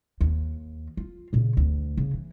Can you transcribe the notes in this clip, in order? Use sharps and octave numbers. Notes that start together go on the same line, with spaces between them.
D#2
F4
A#2 C#3
D2
C#3
E3